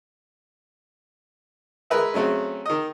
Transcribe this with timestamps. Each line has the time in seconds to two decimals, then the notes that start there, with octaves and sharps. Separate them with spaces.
1.90 G#3 A#4 B4 E5
2.14 C#3 F#3 A3 C4 C#4
2.66 D#3 D#5